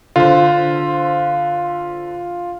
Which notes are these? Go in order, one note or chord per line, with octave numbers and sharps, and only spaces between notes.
D3 F4 C5